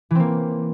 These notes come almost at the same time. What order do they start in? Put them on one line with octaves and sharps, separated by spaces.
E3 C4 A#3